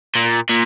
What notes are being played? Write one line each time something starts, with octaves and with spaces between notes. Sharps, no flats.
A#2
A#2